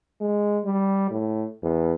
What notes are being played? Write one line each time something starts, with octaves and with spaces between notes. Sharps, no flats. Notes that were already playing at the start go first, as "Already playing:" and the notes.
G#3
G3
A2
E2